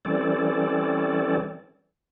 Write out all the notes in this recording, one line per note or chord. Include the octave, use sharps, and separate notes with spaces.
E3 G3 C4 C#4 A4 D5